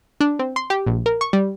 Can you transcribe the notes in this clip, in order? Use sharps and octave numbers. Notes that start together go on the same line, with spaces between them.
D4
C4
C6
G4
A#1
A#4
C#6
G3